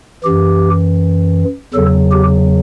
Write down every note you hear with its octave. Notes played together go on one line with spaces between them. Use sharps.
F#2 E3 G4
E2 C#3 F#3 A4
G4